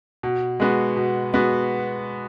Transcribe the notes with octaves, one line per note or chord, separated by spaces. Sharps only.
B2
G#3 B3 F#4
B2
G#3 B3 F#4